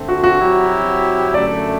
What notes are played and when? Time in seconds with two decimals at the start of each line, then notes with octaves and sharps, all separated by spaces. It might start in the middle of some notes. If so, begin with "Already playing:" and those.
Already playing: D3 A3 C4
0.09 F#4
0.24 F#4
0.40 F#3 C4 E4 G4
1.34 F#2 D3 A3 D5